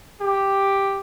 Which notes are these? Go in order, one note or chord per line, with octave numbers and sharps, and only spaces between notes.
G4